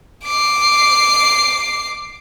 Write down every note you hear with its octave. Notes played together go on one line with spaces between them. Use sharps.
D6 C7